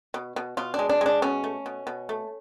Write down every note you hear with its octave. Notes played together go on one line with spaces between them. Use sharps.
B2
B2
B2 F4
D4
G#3
D4
G#3 D4
B2 C#4
A3
B2
B2
A3